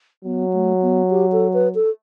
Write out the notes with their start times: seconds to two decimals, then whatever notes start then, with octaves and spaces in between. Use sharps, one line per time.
0.25 F#3 B3
0.53 A3
0.82 B3
1.10 G4
1.32 A4
1.53 B4
1.75 A4